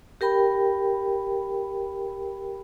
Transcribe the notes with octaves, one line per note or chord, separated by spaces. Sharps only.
G4 A#4 G5 B5